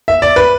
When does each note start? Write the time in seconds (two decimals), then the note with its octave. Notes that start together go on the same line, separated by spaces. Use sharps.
0.08 E5
0.22 D5
0.36 B4